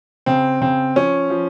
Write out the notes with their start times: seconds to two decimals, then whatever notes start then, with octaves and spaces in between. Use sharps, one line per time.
0.26 C#3 C4
0.61 C#3 C4
0.96 F3 C#4
1.30 F3